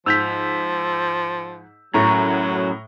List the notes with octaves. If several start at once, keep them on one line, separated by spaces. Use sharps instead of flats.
G#2 F3 E6 G6 B6 F7
F#2 A2 F#3 E4 A#5 C#6